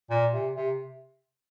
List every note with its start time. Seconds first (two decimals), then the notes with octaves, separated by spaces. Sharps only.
0.10 A#2
0.33 C3
0.55 C3